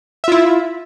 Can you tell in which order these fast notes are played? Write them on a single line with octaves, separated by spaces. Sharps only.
E5 F4 E4